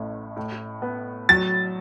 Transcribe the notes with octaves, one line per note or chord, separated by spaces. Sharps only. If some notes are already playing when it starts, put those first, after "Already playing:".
Already playing: A1 A2
A2
B3
F#3 A6